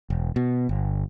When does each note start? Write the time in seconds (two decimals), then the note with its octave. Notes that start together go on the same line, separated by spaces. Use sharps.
0.10 E1
0.36 B2
0.69 G1